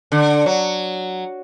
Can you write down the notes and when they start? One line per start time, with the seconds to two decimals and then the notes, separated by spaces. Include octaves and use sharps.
0.12 D3
0.46 F#3